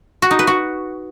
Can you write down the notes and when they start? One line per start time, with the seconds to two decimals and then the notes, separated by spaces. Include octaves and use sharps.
0.22 F#4
0.31 D#4
0.39 B4
0.47 F#4